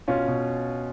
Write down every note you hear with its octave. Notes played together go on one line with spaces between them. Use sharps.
B2 C#4 F4
B2